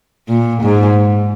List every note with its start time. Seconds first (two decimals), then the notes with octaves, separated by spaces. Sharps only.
0.29 A#2
0.63 G#2